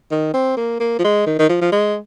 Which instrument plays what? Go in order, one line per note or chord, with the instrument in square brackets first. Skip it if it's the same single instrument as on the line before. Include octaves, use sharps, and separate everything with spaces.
[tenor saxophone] D#3
C4
A#3
A#3
F3
G#3
D#3
D#3
F3
F3
G#3